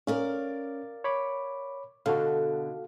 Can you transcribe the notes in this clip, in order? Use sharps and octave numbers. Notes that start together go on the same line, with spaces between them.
C#4 A#4 D5 F5
C#5 B5 D6
B2 D3 F#4 A4 F5